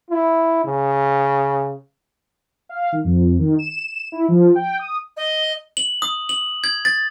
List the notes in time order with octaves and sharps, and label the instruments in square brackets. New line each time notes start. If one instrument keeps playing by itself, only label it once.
[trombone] E4
C#3
[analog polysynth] F5
D#3
F2
D#3
E7
E4
F3
G5
D#6
[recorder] D#5
[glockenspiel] F#7
D#6
F#7
G#6
A6